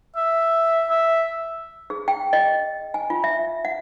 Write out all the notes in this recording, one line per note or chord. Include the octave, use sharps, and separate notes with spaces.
E5
E5
G#4
G5
D#5
G#5
F4
E5
F#5